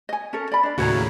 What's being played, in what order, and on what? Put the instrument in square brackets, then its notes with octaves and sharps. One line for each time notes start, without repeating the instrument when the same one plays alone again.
[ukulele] D#5 G#5
C#4 A4 A#4
D5 B5
D4 D5
[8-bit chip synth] D#2 A2 C#3 [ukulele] F#4 C#5 A#5